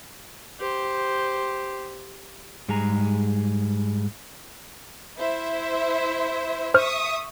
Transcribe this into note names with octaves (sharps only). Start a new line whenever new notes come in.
G4 C5
G#2 G3 G#3 G#4 A#5
E4 C5 E5
C5 E5 C#6 D#6 F6